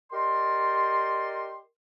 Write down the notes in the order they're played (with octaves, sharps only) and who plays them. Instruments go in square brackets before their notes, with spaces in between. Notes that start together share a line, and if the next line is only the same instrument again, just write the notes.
[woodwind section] G4 A#4 D5 D#5 C6